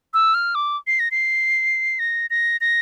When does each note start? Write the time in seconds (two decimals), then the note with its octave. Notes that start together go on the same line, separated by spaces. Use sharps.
0.14 E6
0.34 F6
0.55 D6
0.87 C7
1.00 A#6
1.11 C7
1.99 A#6
2.30 A#6
2.61 A#6